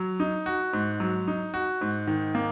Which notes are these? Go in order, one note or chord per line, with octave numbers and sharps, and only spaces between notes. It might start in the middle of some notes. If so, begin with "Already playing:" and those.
Already playing: F#3
D#4
F#4
G#2
F#3
D#4
F#4
G#2
D#3
A#3